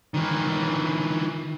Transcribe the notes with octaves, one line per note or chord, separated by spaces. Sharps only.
D#3 E3